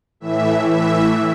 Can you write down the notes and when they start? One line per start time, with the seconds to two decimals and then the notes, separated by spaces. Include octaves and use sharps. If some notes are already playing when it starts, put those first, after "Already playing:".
0.20 A2 E3 E5
0.70 E5